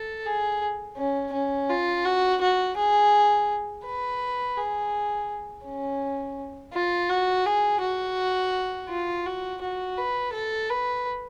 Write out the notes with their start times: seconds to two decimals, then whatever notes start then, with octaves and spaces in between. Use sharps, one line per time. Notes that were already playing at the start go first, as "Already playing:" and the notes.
Already playing: A4
0.26 G#4
0.97 C#4
1.33 C#4
1.70 F4
2.05 F#4
2.41 F#4
2.77 G#4
3.85 B4
4.57 G#4
5.66 C#4
6.73 F4
7.10 F#4
7.46 G#4
7.81 F#4
8.89 F4
9.26 F#4
9.61 F#4
9.98 B4
10.33 A4
10.70 B4